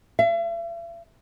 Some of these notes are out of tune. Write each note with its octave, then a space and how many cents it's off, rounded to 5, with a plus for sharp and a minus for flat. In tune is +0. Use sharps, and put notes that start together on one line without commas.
E5 +45